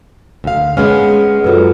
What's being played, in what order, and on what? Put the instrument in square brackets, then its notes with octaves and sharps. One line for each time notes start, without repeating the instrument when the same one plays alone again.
[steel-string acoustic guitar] D2 F5
[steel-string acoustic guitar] G#3 B3 C#4 [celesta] F6
[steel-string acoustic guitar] F#2 F#3 [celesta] F4 A4 B4